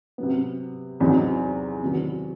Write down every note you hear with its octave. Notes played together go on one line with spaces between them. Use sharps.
C3 F#3 B3
E2 C3 F#3 C4 D#4
C3 D#3 F#3 B3